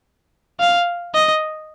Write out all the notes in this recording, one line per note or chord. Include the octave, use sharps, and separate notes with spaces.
F5
D#5